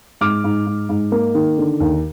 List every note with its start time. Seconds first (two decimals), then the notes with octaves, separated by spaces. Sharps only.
0.21 G#2 D6 F6
0.44 G#2
0.66 G#2
0.89 G#2
1.12 A#3
1.35 D#3
1.58 D3
1.80 D#2